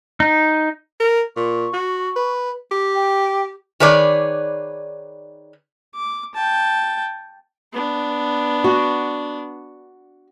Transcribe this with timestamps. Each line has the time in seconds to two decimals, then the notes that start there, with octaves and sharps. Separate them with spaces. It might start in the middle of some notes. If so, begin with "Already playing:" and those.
0.20 D#4
1.00 A#4
1.37 A#2 C#6
1.73 F#4
2.16 B4
2.72 G4
2.95 G5
3.80 D#3 G#4 B4 C#5 D5
5.95 D6
6.35 G5 A5
7.73 B3 D4
8.64 F#4